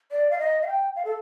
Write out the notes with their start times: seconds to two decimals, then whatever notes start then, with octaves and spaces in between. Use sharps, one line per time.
0.11 D5
0.31 F5
0.39 D#5
0.62 F5
0.67 G5
0.96 F5
1.05 A4